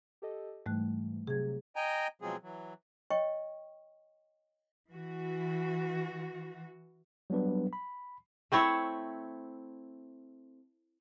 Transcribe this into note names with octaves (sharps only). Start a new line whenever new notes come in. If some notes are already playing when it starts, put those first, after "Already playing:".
G4 A4 D#5
G#2 E3 G3 A3 F#6
C3 F#3 G#4 G#6
D#5 G5 G#5 A#5
B2 F3 F#3 G#3 C4 G#4
E3 F#3
C#5 D#5 G5 C#6
E3 F#4
F#3 G3 B3 D4 B4
B5
A3 C4 E4 C#5